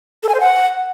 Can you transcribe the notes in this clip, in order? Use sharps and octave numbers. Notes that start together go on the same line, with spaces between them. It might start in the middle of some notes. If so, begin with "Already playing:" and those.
A4
G#5
C5
F#5